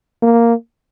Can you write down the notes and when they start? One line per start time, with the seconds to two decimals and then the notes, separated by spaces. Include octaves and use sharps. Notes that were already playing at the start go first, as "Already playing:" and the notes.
0.23 A#3